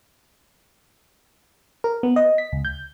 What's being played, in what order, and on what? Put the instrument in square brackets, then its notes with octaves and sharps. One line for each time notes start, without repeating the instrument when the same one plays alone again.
[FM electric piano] A#4
B3
D#5
B6
C#2
G6